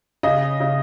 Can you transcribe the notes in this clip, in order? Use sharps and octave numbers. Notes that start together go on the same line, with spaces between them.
C#3 D#5
C#3